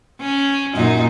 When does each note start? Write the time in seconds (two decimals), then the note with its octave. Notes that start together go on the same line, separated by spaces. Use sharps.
0.21 C#4
0.75 F#2 A#2 D#4